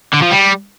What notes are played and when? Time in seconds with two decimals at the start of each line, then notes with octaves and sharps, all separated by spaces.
0.13 D3
0.22 F3
0.31 G3